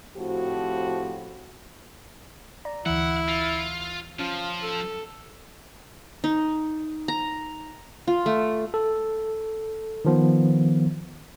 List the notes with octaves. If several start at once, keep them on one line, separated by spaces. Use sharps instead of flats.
A2 F3 C4 F#4 G4
D5 A#5
D2 E3 E4 F#5
F4
F3 C#4 F4
A4
D#4
A#5
F4
A3
A4
D#3 F3 B3